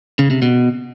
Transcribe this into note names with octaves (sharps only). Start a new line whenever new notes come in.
C#3
C3
B2